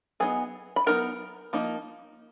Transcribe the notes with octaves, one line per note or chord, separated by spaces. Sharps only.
F#3 B3 D#4 G#4 G#5
B5
F#3 B3 D#4 A#4 A#5
F3 A#3 D#4